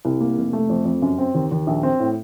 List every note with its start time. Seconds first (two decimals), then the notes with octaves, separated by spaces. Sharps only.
0.05 C2
0.21 A#3
0.37 F1
0.53 A3
0.69 F2
0.85 F2
1.02 F#2
1.18 C4
1.35 D#2
1.52 D#2
1.67 A#1
1.83 C4
2.00 A2